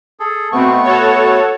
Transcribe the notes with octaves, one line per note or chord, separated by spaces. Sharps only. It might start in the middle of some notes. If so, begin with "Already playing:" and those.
G#4 A4
B2 A3 B3 C4 C#6
F#4 A4 C#5